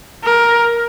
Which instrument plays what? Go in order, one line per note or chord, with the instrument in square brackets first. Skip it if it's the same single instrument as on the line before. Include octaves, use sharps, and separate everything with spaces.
[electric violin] A#4